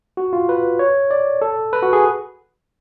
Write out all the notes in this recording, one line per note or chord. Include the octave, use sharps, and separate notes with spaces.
F#4
F4
B4
C#5
D5
A4
B4
F#4
G#4